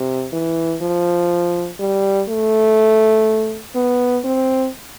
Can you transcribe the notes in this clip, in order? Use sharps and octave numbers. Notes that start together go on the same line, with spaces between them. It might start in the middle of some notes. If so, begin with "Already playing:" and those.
Already playing: C3
E3
F3
G3
A3
B3
C4